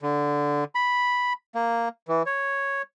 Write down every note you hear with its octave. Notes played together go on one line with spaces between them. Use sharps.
D3
B5
A#3
E3
C#5